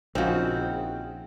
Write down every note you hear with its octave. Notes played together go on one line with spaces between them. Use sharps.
A#1 C#3 C4 C#4 D#4 F#4